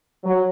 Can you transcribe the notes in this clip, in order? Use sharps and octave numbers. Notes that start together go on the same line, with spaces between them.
F#3